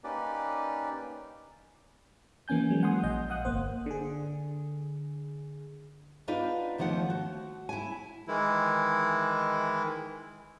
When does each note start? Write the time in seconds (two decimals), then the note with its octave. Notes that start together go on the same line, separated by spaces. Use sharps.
0.04 A#3 C#4 D#4 G4 B4 D5
2.48 E3 A#3 C#4 G#5 G6
2.70 F#3 G#3
2.83 F#5 G#5 C6 D#6
3.03 A#1 D#5 G6
3.29 F5 F#5 D#6 F#6
3.45 G1 A#3 C5
3.86 D3 G#4
6.28 B3 D4 D#4 F4 B4
6.78 D#2 D#3 F3 A3 F#5
7.10 F#4
7.69 E4 G#5
8.28 D#3 E3 G#3 E4